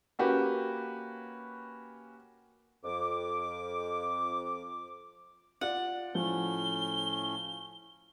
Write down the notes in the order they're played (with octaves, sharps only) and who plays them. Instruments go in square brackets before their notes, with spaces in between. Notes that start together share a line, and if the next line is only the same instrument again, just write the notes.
[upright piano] A#3 C#4 F#4 G4 B4
[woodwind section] F2 D6
[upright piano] F4 D5 [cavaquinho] F#5
[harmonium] A2 A3 C#4 [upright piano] F3 [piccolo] G7